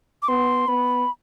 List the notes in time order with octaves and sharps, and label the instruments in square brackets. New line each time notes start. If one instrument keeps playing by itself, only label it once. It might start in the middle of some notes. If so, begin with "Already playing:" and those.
[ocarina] D6
[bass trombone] B3 [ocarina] C6
[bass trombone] B3 [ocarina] B5